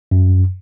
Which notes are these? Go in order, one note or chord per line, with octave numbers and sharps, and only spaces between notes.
F#2